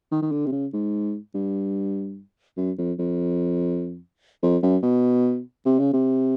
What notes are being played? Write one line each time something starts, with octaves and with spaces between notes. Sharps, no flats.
D#3
D#3
D3
C3
C#3
G#2
G2
F#2
F2
F2
F2
F#2
B2
C3
C#3
C3